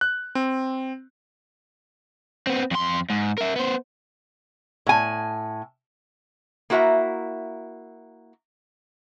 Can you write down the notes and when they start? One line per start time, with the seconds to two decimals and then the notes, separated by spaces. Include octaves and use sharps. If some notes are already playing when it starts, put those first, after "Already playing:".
0.01 F#6
0.35 C4
2.47 B3 C4
2.71 F2 C6
3.10 G#2
3.38 A#4 E5
3.56 B3 C5
4.87 A2 G#5
6.70 A#3 E4 F#4 C5 E5 A#5